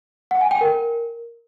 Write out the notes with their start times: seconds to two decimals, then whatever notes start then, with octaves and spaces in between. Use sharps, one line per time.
0.31 F#5
0.41 G#5
0.51 G5
0.61 A#4